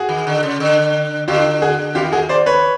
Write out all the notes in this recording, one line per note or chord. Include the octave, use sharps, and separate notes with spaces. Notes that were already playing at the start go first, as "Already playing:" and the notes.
Already playing: F#4 G#4
D#3
D3
C#3
D3
D3 F4 G4
F#4 G#4
D#3 F4 G4
F#4 G#4
C5 D5
B4 C#5